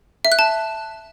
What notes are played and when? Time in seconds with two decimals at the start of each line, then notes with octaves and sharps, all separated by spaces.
0.25 E5
0.32 F#6
0.39 A5